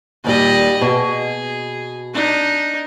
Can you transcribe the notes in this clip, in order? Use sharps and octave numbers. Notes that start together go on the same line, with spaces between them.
D#2 A#2 G3 D5 D#5
B2 G#4
D4 D#4